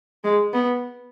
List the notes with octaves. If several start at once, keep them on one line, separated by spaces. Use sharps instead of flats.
G#3
B3